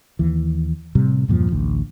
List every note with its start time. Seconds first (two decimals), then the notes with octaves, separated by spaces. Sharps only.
0.19 D#2 E3
0.95 A2 C3 G3
1.28 E2 G2 A#2 F3
1.51 A1 D2